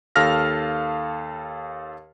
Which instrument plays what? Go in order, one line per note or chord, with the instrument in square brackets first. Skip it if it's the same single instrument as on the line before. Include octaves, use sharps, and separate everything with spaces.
[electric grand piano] D#2 A4 F5 F6 A#6